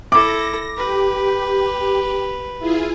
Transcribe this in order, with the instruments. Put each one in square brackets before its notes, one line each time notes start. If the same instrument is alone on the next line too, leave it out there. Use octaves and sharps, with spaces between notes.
[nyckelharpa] E4 A4 [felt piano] D6 [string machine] A#6
[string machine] G4 [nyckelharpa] B4
[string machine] E4 F4 G#4